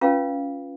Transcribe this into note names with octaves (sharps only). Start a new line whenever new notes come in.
C#4 F4 B4 F5